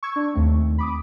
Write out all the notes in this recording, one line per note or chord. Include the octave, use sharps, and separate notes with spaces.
C#6 E6 G#6
D4
D#2 A3 C4
B5 D6 D#6